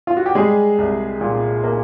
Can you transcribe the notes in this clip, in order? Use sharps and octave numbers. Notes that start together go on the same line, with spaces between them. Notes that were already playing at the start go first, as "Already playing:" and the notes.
F4
F#4
G4
G3 G#3 G#4
C2
A#2
A#3